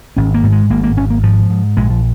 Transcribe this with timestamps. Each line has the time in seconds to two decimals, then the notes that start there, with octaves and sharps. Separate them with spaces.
0.17 G#1 C#4
0.34 A#3
0.44 G#2
0.52 G#3
0.70 G#1 A#3
0.83 A#3
0.97 G#1 C#4
1.10 A#3
1.23 G#2 F3
1.50 G#2
1.77 A#1 G#3
1.90 F3